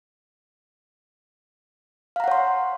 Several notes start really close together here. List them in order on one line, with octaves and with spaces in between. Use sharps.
F5 A#5 F#5 C#5 C6